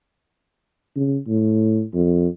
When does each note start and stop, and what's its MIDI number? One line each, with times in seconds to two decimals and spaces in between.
0.96 1.18 49
1.27 1.83 45
1.94 2.27 41